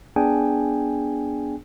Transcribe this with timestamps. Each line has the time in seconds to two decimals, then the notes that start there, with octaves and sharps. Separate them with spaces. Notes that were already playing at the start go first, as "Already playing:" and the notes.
0.16 B3 D4 G#4 G5 G#5